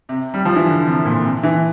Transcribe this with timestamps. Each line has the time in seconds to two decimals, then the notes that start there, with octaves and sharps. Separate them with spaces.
0.09 C3
0.34 G3
0.45 F3
0.56 E3
0.67 D3
0.86 C3
1.05 A#2
1.24 C3
1.43 E3